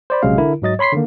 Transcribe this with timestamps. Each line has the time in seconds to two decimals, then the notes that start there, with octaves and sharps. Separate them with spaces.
0.10 C5 D5 B5
0.22 A#1 C3 F#3 G#3 C#4 F5
0.38 D3 E4 A#4
0.62 G#2 F#3 D#5 A6
0.79 C#5 B5 C6 B6 C7
0.93 D3 D#3 A#3